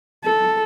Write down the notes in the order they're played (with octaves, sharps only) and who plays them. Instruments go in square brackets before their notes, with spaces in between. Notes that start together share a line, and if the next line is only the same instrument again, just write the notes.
[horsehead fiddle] A4